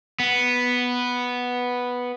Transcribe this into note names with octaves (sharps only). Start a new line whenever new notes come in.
B3